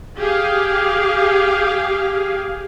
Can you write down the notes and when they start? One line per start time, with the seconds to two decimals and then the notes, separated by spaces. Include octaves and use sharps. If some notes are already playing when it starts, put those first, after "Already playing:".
0.18 G4 G#4 F5